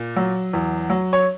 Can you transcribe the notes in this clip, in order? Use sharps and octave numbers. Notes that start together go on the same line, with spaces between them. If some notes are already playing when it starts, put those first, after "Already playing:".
Already playing: A#2
F#3
E2
F#3
C#5